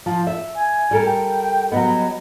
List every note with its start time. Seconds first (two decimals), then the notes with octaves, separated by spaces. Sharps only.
0.06 F3
0.27 E5
0.55 G#5
0.91 G3 A4 A#4
1.05 G5
1.72 F#3 G3 B3 D#5